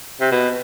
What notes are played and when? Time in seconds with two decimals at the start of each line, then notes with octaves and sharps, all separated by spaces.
0.20 C3
0.31 B2